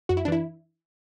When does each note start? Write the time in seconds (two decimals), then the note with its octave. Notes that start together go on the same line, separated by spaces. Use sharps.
0.09 F#2 F#4
0.17 E4
0.25 D4
0.28 E3 E4